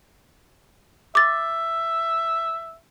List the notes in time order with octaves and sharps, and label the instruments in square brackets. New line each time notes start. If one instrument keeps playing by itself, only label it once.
[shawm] E5 [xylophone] D6 A6